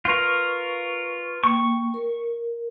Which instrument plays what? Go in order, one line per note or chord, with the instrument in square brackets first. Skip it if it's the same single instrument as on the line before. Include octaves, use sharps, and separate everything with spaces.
[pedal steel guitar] F4 A#4 [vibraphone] B4 C#6
[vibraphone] A#3 G5 [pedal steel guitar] C#6
[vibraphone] A#4